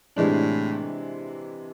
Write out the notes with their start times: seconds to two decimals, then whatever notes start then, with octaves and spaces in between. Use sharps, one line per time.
0.16 A2 C3 E3 G#3 D4